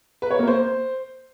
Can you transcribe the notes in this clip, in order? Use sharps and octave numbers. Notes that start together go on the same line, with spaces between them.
B4
C#5
A#3
C5